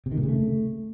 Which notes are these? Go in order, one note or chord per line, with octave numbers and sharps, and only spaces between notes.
C3
D#3
A2
C#3
A3